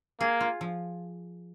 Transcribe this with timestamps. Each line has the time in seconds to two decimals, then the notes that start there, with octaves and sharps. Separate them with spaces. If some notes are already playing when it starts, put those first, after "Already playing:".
0.20 A#3 G#4
0.41 F4
0.61 F3